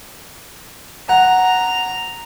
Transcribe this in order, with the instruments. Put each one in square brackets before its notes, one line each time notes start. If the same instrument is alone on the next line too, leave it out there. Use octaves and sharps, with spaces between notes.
[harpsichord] F#5 [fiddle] A#5